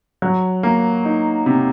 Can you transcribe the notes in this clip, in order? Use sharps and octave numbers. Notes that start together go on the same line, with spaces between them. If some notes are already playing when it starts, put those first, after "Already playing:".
F#3
A#3
D#4
C3